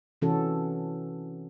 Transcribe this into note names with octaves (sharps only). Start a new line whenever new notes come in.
C3 E3 C#4 F#4 A4